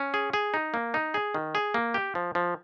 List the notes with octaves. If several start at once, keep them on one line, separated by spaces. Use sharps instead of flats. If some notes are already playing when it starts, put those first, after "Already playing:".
Already playing: C#4
G#4
G#4
D#4
A#3
D#4
G#4
D#3
G#4
A#3
G4
F3
F3